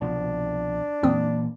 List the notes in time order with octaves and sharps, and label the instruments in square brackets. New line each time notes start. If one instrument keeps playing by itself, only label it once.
[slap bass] C2 B2 F3 [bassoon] D4
[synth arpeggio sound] F2 C4 D#6 [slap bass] A#2 E3 A#3